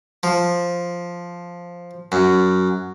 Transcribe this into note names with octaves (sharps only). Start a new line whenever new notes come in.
F3
F#2